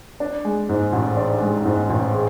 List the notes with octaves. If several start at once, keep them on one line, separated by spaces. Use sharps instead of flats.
D4
G#3
G#2
A1
D4
G#3
G#2
A1
G#4